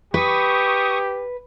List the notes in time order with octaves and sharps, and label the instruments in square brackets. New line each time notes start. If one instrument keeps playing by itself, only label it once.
[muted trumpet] G4 [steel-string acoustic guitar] B4 [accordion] C#6 D#6